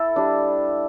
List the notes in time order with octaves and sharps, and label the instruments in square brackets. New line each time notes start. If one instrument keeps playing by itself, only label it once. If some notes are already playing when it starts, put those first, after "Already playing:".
Already playing: [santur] E4 A4
G3 D4